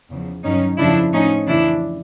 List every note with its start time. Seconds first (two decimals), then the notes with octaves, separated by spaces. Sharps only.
0.10 E2 C#3 F3
0.44 G2 D#3 F#3 C#4 D#4
0.78 F2 C#3 F3 D4 E4
1.13 A2 F3 C#4 D#4
1.47 F2 C#3 E3 D4 E4